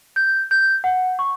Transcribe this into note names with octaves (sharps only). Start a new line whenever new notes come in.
G6
G6
F#5
C#6